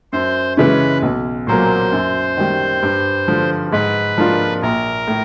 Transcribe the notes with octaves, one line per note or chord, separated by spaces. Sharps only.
F#2 C5
C#3 E3 G#3 C#4 B4
B1
A#2 F#3 A#3 C5
F#2
D#3 G3
G2
D3 F3
G#2 B4
F3 A#3 D4 F4
A#1 A#4
A2